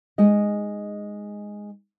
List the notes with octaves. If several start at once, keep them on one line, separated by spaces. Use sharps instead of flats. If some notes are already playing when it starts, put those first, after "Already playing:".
G#3 D#4 D#5